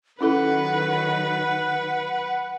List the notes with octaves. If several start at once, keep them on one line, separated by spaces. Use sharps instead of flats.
D#3 F#3 C#4 E4 A4 B4 F#5